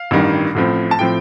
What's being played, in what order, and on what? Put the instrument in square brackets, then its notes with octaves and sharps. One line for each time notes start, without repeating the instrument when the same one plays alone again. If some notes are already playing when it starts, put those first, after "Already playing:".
Already playing: [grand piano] F5
A1 G2 D#3 G3
A1 A2 F3 C4
A5
A2 F3 C4 G5